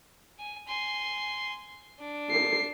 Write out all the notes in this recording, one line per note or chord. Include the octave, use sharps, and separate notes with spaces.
G#5
G#5 C6
D4
C7